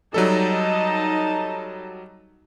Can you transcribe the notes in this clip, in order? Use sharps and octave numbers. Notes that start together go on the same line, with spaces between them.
F#3 G3 D#4 A4 D#5 A5